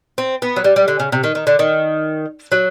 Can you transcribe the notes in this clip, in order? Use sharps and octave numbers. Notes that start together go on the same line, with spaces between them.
C4
B3
F#3
G3
G3
D3
C#3
C3
D#3
D#3
D3
D#3
F#3